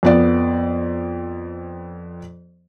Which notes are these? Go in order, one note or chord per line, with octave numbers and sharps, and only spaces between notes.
F2 B3 D5